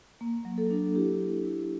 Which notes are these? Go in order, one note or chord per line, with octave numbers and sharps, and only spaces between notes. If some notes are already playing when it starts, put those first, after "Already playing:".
A#3
F#3
A4
D4
E4 G4
E4
E4